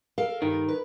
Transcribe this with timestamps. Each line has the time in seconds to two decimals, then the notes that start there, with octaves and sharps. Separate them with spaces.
0.18 A4 A#4 F5
0.42 G2 D#3
0.68 B4